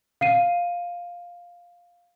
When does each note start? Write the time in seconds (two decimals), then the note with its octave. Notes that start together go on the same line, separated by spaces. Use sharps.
0.21 F5 C7 D#7